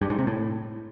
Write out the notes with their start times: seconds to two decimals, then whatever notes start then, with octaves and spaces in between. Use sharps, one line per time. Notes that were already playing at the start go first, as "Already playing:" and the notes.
0.01 G2
0.10 G#2
0.19 C3
0.27 A2